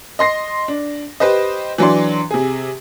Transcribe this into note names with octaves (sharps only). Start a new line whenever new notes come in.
D#5 C6 A#6 C7
D4
G4 B4 C5 D#5
E3 F#3 D4 C6
C3 G#4